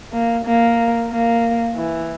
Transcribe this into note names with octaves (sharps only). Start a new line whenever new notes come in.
A#3
A#3
A#3
E3